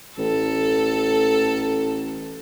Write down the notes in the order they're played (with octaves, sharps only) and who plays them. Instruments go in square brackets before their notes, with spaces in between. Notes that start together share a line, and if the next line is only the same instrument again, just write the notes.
[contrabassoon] A1 [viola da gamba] A4